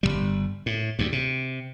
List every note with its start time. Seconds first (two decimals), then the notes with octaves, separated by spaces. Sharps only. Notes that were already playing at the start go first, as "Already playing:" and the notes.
0.03 G1 D#2 G3
0.66 A2
0.99 D2 G2
1.12 C3